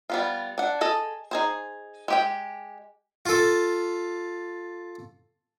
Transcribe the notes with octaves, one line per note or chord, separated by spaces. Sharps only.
G3 B3 F4
D4 F#5
G#4 A4 D#5
D#4 G#4 C5
G#3 G4 G5
F4 A4